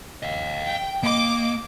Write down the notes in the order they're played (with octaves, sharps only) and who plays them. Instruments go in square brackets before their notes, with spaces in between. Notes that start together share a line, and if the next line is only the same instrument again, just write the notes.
[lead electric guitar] D#5 F5
[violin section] G5
[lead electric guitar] A#3 [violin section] D#5 D6 D7